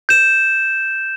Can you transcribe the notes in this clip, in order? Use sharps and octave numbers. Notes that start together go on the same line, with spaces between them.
G6 E7